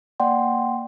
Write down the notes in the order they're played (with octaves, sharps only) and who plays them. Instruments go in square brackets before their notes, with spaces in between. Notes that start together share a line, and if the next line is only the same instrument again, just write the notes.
[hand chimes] A#3 D5 F#5 G5 C6